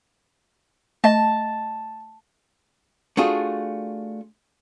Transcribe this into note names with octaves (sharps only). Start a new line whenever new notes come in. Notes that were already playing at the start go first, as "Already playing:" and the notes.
A3 D#5 A5
A3 D4 F4 F#4 G#4